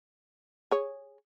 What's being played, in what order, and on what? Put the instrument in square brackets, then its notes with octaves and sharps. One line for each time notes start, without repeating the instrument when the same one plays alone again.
[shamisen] G#4 C#5